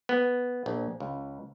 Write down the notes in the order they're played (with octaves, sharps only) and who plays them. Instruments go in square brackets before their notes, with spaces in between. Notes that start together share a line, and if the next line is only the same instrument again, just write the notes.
[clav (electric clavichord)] B3
A#1
C#2